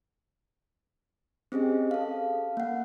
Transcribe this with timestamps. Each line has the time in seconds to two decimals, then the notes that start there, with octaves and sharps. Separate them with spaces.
1.52 C4 C#4 G4 G#4 D#5
1.91 A4 F5
2.57 A#3 F#5